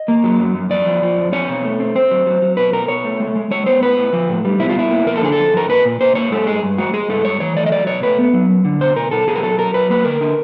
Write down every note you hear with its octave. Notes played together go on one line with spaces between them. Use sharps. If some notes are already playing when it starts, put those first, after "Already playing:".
Already playing: D#5
A#3
F#3
F#2
F#2
F2 D5
F3
F3
F2
C4 C#5
B2
A3
C4
C4 C5
F#3
F#3
F#3
B2 B4
B2 A#4
B2 C#5
A3
G#3
G#3
G#3 C#5
B3 C5
A2 B4
A2
F3
A2
G3
B2 E4
F4
B2 E4
A#3
F2 A#4
A4
D3 G#4
A4
F2
F2 A#4
A#2 B4
A#2
A#2 C5
A#3 C#5
G#3 A4
G2 G#4
G2
G#3 F#4
G#3 G#4
G2 A4
G2 C#5
E3 C#5
A3 D5
D#5
F#3 D5
B2 C#5
A3 B4
B3
F#3
F#2
D3
B2 C5
B2 A#4
B2 A4
B2 G#4
A#4
F#3 A4
F#3 A#4
F#3 B4
A#3 B4
D3 A#4
D3